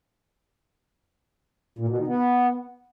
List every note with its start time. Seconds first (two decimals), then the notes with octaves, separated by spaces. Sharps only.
1.79 A#2
1.88 B2
1.98 D#3
2.07 B3